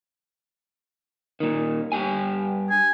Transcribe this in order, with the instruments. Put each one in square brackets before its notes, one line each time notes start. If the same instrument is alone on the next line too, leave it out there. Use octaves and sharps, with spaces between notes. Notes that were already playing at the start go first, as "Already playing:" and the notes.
[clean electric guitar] A#2 D#3
G2 G4 G#5
[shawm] G#5